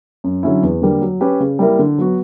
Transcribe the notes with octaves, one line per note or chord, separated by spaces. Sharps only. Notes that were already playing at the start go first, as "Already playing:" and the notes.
F#2
D3 F#3 C#4 E4
E2
D3 G3 A#3
F#3
C#4 G4 B4
C#3
G3 A#3 E4 A#4
D3
F#3 B3 F#4